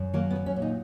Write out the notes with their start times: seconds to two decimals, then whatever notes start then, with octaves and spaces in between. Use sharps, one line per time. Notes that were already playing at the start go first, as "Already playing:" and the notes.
Already playing: F#2
0.14 F#3 A#3
0.30 B3
0.36 F#3
0.46 C#4
0.56 A#2
0.62 D#4